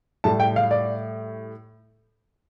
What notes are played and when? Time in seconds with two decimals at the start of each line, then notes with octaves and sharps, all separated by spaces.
0.24 A2 G3 A5
0.40 G5
0.56 F5
0.71 D5